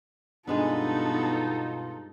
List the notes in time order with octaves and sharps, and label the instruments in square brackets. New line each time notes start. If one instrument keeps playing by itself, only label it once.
[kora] G2 G#3 G#4 [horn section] B2 F4 [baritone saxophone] B3 [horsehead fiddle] D#4 A4